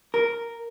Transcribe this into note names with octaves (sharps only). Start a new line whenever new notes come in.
A#4